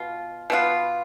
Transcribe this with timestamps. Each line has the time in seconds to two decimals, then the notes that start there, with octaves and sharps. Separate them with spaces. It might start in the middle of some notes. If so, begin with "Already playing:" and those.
Already playing: B2 F4
0.50 B2 B3 F4